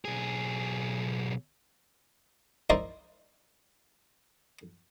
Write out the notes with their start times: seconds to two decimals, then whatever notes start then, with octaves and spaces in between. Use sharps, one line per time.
0.05 B1 G#4
2.70 D#4 E4 A#4 C5 D5 D#5